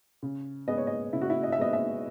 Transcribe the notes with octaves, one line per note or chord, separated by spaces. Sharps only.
C#3
G#3 B3 D#5
C#5
D#5
C#3 E4
F#4
E4
D#5
E5
G#3 B3 D#5
E5